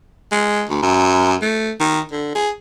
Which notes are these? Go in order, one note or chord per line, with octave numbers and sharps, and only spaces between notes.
G#3
D2
F#2
A3
D#3
D3
G#4